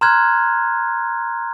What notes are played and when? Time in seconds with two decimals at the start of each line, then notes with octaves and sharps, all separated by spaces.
0.01 A#5 C6 F6 F#6 G#6